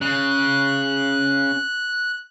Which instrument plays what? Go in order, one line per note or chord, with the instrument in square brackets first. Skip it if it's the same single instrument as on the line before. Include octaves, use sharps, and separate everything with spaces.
[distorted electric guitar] C#3 [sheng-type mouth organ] F#6